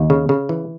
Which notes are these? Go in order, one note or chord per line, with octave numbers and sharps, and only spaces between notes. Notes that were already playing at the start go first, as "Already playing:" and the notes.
Already playing: D#2
C#3
C#3
E3